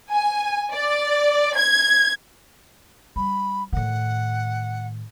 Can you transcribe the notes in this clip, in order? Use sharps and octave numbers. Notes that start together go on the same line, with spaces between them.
G#5
D5
G#6
G3 B5
A2 D#3 F#5